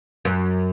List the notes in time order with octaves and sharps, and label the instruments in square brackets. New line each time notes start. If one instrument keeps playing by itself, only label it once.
[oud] F#2